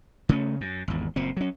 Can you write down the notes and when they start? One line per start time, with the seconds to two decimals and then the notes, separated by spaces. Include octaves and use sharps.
0.29 C#3 A3 C#4
0.61 F#2
0.88 G#1 E2
1.16 F#1 A#2 C4
1.37 F#3 C#4